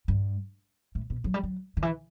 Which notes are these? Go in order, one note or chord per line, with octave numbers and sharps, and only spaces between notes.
G2
A2
B2
F#3
G3
F#3
D3
E3